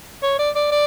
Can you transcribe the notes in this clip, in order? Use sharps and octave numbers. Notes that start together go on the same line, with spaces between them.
C#5
D5
D5
D5